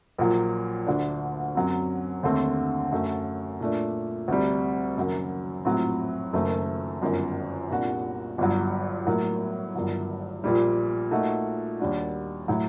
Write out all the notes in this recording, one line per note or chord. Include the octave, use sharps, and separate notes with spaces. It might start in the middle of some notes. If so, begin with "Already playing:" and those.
A#1 A#2 F#3
D2 D3 A3 D4
F#2 F#3 C4
D#2 D3 A3 C4
F#2 F#3 A3
A#2 A3 D4
D2 C3 G3
F#1 F#2 D#3 F#3
A#1 A2 F#3 C4 F#4
F#1 F#2 D#3 A3
G1 F#2 D#3
C2 A#2 G3 D4 F#4
G1 G2 F#3
A2 F#3 A#3
G1 G2 D#3 F#3
A#1 A#2 G3
A#2 A3 D#4 F#4
D#2 D#3 G3 D4 F#4
A2 F#3